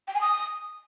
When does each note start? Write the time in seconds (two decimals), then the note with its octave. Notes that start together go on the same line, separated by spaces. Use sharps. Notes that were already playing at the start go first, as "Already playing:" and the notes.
0.07 G5
0.14 G#5
0.21 D#6